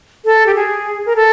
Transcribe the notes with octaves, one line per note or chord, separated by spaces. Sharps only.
A4
G4
G#4
A#4
A4